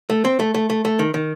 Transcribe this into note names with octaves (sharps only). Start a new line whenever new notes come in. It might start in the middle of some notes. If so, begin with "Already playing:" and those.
A3
C4
A3
A3
A3
A3
D#3
D#3